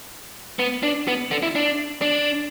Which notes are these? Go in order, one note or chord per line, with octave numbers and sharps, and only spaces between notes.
B3
D4
B3
D3
E4
D4
D4